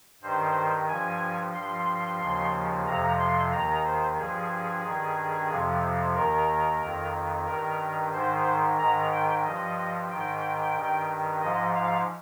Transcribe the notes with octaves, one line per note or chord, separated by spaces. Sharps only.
G2 D#3 C5
G2 F3 G#5
G2 F3 C6
D#2 C#3 F3
F2 C3 F3 A#5
C6
D#2 D#3 A#5
C5
G2 F3 G#4
G2 D#3
F2 C3 F3
D#2 D#3 A#4
F2 D#3
G2 D#3 A#4
G#2 D#3 C5
G#2 D#3 A#5
G5
G2 F3 D#5
G#2 D#3 G5
G2 D#3
G#2 F3 D#5
F5